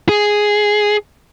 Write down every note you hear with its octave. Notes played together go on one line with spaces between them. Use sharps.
G#4